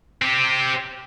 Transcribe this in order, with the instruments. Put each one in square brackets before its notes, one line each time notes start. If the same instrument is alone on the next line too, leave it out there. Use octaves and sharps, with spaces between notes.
[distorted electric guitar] C4 G4